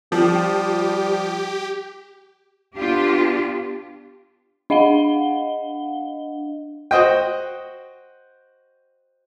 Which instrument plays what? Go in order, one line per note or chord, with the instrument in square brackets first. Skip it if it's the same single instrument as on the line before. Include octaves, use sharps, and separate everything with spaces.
[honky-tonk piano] F3 [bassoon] G3 [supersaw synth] G4
[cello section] B3 D4 F4 G4
[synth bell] D4 D#5 F5 F#5 G7
[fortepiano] F#4 C5 D#5 G5